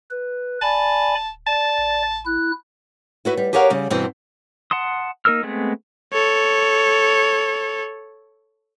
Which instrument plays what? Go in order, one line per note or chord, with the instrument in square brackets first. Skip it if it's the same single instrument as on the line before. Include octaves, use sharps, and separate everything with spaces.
[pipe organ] B4
[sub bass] D1 [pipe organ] D5 G#5 B5 [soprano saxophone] A5
[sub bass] D1
[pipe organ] D5 [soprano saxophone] A5
[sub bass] A1
[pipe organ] E4 F#6
[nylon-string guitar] E4 F#4 B4
G3
G4 G#4 A#4 C#5 F5 F#5
C#3 G3
G2 B2 E3 C4 C5 G5
[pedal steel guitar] F#5 A5 C6 D#6
A#3 D#4 A#4 E6 F6
G#3 A3 B3 C4 G#4
[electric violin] A4 C#5